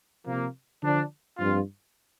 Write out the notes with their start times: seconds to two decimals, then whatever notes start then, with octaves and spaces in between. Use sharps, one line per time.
0.25 C3 F3 A#3
0.81 D3 F3 D4
1.38 G2 F3 C4 F4